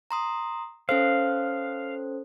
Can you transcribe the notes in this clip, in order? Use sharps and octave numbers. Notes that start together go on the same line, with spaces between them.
A#5 C6 D#6
C#4 A4 C5 F5